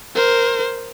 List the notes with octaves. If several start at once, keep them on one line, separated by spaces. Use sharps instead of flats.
A#4 C5